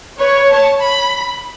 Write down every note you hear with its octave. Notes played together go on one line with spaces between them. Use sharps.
B4 C#5
A5
B5